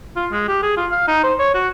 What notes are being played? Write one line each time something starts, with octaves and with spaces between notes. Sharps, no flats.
F4
G#3
G4
G#4
F4
F5
D#4
C5
C#5
F#4